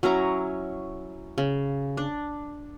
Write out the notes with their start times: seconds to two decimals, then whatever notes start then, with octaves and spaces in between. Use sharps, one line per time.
0.03 F#3 C#4 E4 A#5
1.38 C#3
1.97 D4